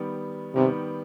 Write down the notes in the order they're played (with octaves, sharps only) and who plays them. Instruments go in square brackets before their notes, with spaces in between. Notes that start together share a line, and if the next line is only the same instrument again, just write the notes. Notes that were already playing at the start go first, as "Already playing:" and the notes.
Already playing: [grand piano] D#3 G3 B3
[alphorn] C3 [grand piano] D#3 G3 B3